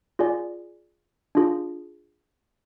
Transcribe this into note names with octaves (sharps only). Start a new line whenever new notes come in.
F4 G#4 D5 G#5
D4 F4 G#4